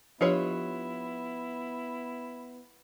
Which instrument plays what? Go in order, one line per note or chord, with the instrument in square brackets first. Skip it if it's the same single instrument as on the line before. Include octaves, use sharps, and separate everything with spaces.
[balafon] F3 D4 G4 [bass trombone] B3 [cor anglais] E4 [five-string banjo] F4 B4 C#5